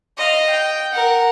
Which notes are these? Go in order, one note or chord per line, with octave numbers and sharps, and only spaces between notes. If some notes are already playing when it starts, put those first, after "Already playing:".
D#5 F5
G5
A#4 F#5